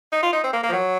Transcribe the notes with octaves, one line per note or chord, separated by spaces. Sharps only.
D#4
F4
D#4
C4
A#3
A#3
F3
F#3